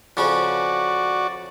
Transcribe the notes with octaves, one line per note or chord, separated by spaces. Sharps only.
F2 C#3 C#4 F#4 D5